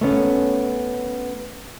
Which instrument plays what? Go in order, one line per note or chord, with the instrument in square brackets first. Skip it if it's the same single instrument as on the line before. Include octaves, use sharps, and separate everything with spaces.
[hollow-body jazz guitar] A3 B3 C#4